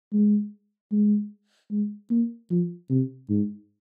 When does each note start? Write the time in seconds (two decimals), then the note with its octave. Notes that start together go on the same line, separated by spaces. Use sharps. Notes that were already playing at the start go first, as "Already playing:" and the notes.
0.13 G#3
0.92 G#3
1.71 G#3
2.10 A#3
2.50 F3
2.90 C3
3.29 G#2